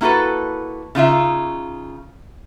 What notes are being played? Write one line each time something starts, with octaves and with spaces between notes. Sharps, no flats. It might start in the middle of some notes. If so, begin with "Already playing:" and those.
A#3 E4 F#4 A4 B4
C#3 D#4 F4 E5